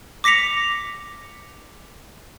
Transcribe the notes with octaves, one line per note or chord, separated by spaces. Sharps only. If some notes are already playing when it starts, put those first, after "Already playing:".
D6 A#6 B6 C#7 F7